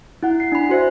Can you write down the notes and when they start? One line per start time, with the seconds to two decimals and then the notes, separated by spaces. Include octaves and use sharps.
0.23 E4 F#5
0.40 C7
0.52 D4 B5
0.69 F#4 C5 E5